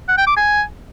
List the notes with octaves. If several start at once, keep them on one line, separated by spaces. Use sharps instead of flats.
F#5
G5
D6
G#5